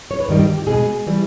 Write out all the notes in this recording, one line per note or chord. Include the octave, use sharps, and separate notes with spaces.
C#5
B4
G2 D#3 G3 A#4
G4
G4
B2 G#3 G#4
E3 G3